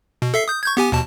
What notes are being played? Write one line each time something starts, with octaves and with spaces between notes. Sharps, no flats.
B2
A4 E5 C7
D#6 G6
C#6 G6 G#6
B3 G4 G#5
D#2 B2 A5